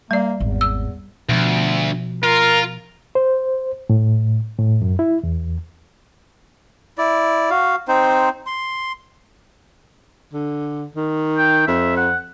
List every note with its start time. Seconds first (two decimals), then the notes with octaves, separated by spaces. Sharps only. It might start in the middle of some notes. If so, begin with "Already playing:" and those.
0.11 G3 A#3 D5
0.40 G#1 E2
0.61 E6
1.29 D2 B2 F3
2.23 F4 A#4
3.15 C5
3.90 A2
4.58 A2
4.82 F#2
4.99 E4
5.24 E2
6.98 E4 D5
7.50 F#4 F5
7.88 C4 D#4 C5
8.46 C6
10.33 D3
10.96 D#3
11.38 G5
11.68 F2 E5
11.97 F#5